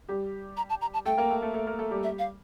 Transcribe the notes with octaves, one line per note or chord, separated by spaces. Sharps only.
G3 G4
A#5
A5
A#5
A5
A3 A4 G5
A#3 A#4
A3 A4
A3 A4
A3 A4
A#3 A#4
A3 A4
G3 G4
E5
F5